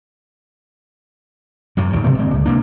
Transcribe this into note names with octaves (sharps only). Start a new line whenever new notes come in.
F#2 A2 C3 F#3
D#2 G#2 B2 D3
B2 D3 A3 B3
D1 A#2 G#3 C4
C#2
C3 A#3 D4